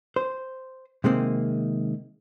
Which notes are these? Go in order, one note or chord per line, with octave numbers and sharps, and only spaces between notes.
C5
C3 D#3 G#3 A#3 C4